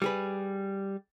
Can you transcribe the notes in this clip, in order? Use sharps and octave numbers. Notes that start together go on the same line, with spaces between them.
G3 G#4 B4